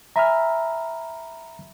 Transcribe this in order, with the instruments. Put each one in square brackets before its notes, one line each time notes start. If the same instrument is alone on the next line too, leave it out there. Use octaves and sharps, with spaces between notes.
[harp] E5 G#5 E6 [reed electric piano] A#5 B5 F6